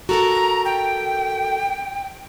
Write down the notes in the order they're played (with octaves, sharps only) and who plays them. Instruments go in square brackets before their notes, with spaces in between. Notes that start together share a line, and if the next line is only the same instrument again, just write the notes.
[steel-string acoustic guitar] F#4 A4 A#4 [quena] A#5
[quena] G5